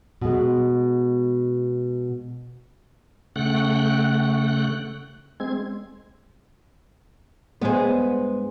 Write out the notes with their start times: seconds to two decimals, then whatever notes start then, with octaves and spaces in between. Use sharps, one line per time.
0.21 B2 G#3
3.36 C#3 A3 F#5 G5 F#6
5.40 G#3 C4 G#6
7.61 G2 G#3 B3 G#4 C5